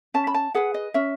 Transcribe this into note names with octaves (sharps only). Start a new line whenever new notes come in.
C#4 A5
B5
A5
G#4 B4 F#5
D#5
C#4 E5